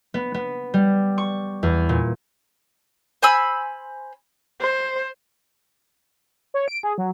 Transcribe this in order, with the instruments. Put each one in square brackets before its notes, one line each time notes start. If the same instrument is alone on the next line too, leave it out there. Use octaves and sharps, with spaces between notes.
[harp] B3
B3
G3
C#6
E2
A#2
[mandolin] C5 G#5 B5 E6
[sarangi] C5
[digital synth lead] C#5
D7
G#4
F#3